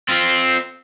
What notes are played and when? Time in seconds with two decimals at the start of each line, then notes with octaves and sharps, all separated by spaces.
0.09 C4 F4